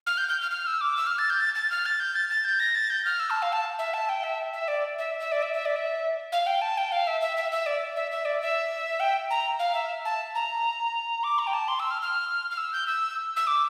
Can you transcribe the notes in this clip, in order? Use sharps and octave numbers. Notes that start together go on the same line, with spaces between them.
F6
G6
G6
F6
F6
E6
D6
E6
F6
A6
G6
A6
A6
F6
A6
G6
A6
A6
G6
A#6
A6
G6
F6
E6
A5
F5
A5
E5
A5
G5
E5
E5
D5
E5
E5
D5
E5
E5
D5
E5
F5
G5
A5
G5
F5
E5
E5
E5
E5
D5
E5
E5
D5
E5
G5
A#5
F5
E5
A5
A#5
D6
A#5
G5
A5
C6
E6
F6
F6
F6
E6
G6
E6
E6
D6